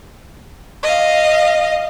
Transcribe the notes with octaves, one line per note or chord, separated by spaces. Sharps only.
D#5 F5